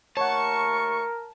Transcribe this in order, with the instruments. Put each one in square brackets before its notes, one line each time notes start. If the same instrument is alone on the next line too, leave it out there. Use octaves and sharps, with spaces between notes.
[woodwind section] D#2 A3 C#6 [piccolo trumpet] A#4 [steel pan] C#5 F#5 [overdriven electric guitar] A5